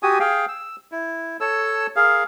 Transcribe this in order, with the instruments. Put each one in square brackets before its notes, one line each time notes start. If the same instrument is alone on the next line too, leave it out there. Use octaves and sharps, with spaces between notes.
[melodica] F#4 G4 G#5 D#6
G#4 F5 G5
E6
E4
A4 C#5 A5 E6
G#4 A#4 F5